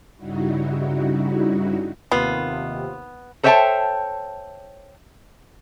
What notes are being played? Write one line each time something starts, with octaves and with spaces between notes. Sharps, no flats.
G2 C#3 G3 D#4 E4 F#4
D#2 C3 B3 F4
A4 C5 C#5 E5 G5 A5